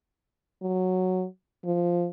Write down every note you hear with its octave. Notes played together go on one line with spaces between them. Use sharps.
F#3
F3